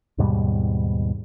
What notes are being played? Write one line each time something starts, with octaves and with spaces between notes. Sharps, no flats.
D#2 G#2 B2 G3